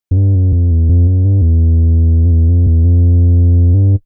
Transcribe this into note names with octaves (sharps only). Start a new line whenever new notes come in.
F#2
G2
F#2
F2
E2
F2
F#2
G2
E2
F2
E2
F2
E2
F2
G2